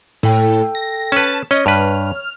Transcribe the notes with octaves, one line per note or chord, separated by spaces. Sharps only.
A2 A4 G5
A#6
C#4 B4 A5
C#4 C#5 D#5
G2 B4 F6